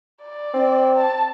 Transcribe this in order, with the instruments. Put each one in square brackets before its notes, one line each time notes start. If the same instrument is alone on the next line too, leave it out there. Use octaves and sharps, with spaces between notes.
[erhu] D5
[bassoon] C4
[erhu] A5